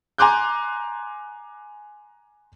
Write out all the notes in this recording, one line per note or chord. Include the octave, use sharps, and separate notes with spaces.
G#5 A#5 C6 D6 F#6 G6